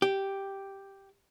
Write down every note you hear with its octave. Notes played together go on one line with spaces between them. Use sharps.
G4